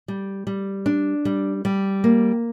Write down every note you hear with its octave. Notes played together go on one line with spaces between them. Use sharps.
G3
G3
D4
G3
G3
A#3